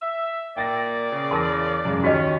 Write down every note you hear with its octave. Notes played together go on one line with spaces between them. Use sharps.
E5
A#2 A#3 D5 G5 A6 A#6
C#3
E2 A#4 A5 C6 D#6 A#6
F#2 C#3 G#3
D#2 C#4 F#4 G4 D#5